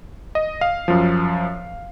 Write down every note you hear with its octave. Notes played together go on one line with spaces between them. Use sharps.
D#5
F5
F#2 F3